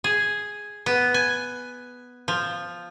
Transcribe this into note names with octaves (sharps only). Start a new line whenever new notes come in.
G#4
B3
G#5
F3